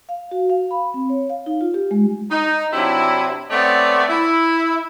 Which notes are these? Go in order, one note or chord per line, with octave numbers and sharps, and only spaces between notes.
F5
F#4
F5
B5
C4
C#5
F5
D#4
F4
G4
G#3
D#4
C3 F#3 D4 E4
A3 B3 C4 C#5 D5
E4